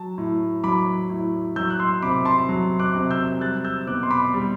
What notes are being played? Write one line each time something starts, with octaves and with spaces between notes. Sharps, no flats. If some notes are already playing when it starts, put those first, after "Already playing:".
Already playing: F#3 A5
A2
F#3 B5 D6
A2
F#3 E6 G6
F#6
C6 E6
C3 B5 D6
A5 C6
F#3
D6 F#6
C3
E6 G6
G3 F#6 A6
E6 G6
B2 D6 F#6
C6
B5 D6
G3